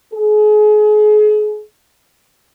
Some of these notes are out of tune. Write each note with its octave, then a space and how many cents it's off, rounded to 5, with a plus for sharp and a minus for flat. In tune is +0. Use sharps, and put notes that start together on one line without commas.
G#4 +35